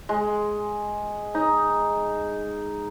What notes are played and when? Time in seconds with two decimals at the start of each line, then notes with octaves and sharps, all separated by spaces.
0.09 G#3
1.35 D#4